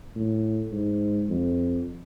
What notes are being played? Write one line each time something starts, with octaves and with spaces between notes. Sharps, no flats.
A2
G#2
F2